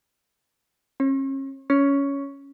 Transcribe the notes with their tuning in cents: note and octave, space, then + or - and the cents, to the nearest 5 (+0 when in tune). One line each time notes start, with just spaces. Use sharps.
C#4 -40
C#4 +10